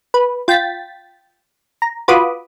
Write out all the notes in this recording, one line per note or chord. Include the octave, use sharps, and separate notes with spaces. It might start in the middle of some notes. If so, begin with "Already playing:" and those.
B4
F4 G5 A6 B6
A#5
F4 F#4 B4 B5 D6 D#6